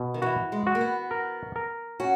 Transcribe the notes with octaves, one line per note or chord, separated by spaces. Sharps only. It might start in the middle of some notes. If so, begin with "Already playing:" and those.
Already playing: B2
D#3
E3 F#4
G#3
F#4
A#3
B3
A#4
A#4
C#4 F#4